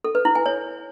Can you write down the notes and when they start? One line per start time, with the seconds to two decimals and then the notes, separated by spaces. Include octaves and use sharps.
0.04 A4
0.15 B4
0.25 E4
0.35 G#5
0.46 C#5